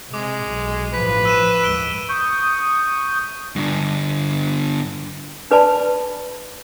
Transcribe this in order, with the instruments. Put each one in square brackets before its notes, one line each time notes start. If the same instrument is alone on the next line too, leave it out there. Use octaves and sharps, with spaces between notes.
[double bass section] C3 [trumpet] G#3 [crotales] D6
[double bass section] B1
[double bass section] A1 G2 F3 [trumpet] B4 [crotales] B6
[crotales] E6 D#7 E7
[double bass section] D#2 G#3 [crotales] D7 G7
[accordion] C#6 D#6 G6
[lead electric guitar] G2 D3
[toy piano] D4 B4 D5 A5 B5